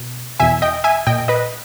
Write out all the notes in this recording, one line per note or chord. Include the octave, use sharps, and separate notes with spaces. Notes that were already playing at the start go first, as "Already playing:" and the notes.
Already playing: B2
E2 B2 E5 G#5
D#5 G5
E5 G#5
A#2 D#5 G5
B4 D#5